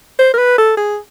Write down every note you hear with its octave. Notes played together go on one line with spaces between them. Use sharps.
C5
A#4
B4
A4
G#4